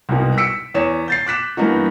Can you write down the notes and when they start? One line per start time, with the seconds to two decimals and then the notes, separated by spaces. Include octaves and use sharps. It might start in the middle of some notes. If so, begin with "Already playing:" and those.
0.09 C2 G#2 B2
0.37 E6 B6 C#7 D7
0.74 E2 C#5 E7
1.08 G6 A6 C7
1.26 D6 F#6 B6 E7
1.57 G2 E3 A#3 B3 D#4 F#4